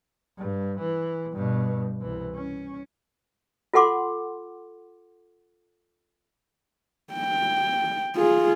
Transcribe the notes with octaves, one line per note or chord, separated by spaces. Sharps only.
G2
E3
G2 B2
C2 E3
C#4
F4 A4 F#5 C6 D6
G5
F4 G#4